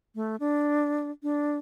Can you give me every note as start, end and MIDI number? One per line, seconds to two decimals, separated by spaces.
0.15 0.36 57
0.40 1.11 62
1.23 1.58 62